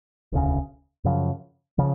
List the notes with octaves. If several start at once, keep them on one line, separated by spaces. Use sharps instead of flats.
E1 D2 C#3
F#2 C#3 F3
C#3 F3